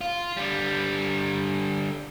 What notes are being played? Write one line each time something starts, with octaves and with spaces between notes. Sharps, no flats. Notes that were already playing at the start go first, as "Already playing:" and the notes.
F4
D3 G3